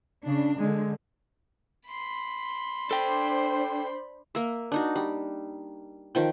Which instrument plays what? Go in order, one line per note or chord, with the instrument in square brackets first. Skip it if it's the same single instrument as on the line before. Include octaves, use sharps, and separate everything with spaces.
[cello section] C#3 D4
[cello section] D3 [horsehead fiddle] G#3
[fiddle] B5 C6
[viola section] D4 C5 [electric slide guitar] A4 G5
[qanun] A#3 E5
D4 D#4 F#4
G3
D#3 F3 G5